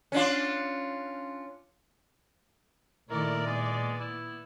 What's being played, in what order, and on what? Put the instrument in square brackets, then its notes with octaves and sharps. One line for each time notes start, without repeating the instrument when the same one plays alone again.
[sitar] C#4 D4 F4
[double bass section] A#2 [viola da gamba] D#3 A3 E4 [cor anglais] A#4 [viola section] D5
[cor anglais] G#3 [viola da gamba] B3
[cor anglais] E4